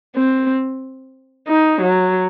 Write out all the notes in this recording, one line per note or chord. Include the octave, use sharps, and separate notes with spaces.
C4
D#4
F#3